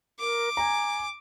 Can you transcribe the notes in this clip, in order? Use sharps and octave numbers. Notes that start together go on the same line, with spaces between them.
A#4 D6
G#5 A#5